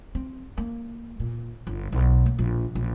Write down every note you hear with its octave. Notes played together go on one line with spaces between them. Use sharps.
C4
A#3
A#2
G1
B1
A#3
A#1
A#1